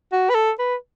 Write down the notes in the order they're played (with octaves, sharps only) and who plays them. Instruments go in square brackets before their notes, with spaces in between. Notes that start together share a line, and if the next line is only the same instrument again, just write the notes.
[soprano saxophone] F#4
B4
A4
B4